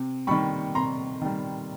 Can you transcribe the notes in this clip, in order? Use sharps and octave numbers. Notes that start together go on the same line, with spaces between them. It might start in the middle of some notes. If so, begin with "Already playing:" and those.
Already playing: C3
D#3 G3 B5 C#6
C3 A#5 C6
D#3 G3